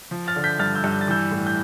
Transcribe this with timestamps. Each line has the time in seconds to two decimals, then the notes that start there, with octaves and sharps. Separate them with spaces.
0.11 F3
0.28 F6 A6
0.36 D3
0.44 G6 B6
0.59 G2 F6 A6
0.75 E6 G6
0.84 G2
0.92 G6
1.01 A6
1.08 E3 E6 G6
1.31 A2
1.47 G6